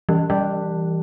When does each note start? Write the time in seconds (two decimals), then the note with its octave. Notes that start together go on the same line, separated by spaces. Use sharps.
0.09 E3 G3 G4
0.30 E3 G3 G4